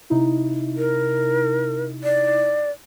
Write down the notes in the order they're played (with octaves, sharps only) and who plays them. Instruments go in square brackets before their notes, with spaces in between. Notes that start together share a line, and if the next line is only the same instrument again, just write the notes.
[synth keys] C3 D#4 E4
[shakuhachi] A#4
D5